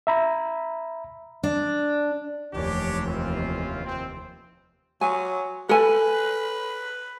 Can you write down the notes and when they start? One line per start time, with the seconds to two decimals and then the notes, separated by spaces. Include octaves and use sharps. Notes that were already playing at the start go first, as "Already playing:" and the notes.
0.07 E5 A#5 B5
1.43 D4
2.54 F1 D#2 E3 D4 G4 C#5
3.06 C4 C#4 F4
3.85 C4
5.01 F#3 G#5
5.69 A4 B4 G#5